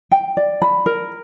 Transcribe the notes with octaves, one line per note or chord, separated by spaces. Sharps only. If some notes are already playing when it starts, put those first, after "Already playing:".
G5
D5
B5
A#4